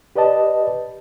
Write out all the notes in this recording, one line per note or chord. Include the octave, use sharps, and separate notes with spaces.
G4 B4 D5 D#5 A5